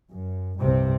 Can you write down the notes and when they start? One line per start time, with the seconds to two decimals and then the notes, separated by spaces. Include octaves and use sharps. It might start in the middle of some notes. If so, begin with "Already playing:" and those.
0.10 F#2
0.59 C2 G2 C3 C4